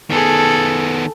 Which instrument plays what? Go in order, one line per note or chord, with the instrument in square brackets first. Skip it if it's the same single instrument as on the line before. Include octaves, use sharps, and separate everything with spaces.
[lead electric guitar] D#3 B3 [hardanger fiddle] G#4 A4